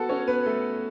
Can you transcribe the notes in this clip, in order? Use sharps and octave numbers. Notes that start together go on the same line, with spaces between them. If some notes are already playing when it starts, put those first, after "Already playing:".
Already playing: B3 F#4 A4 F#5 A5
C#4 C#5
B3 B4
A3 A4